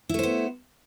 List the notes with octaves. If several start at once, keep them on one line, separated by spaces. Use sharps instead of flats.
A3 B3 E4 C5